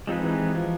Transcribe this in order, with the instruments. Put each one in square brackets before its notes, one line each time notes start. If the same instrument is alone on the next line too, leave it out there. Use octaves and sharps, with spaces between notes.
[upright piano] F3 [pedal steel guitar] G#3 C4 D#4 G#4 B4
[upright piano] E3
F3